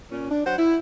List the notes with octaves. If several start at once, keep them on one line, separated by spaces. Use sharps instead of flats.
A#2 C#4
D4
F#3 C5 F#5
E4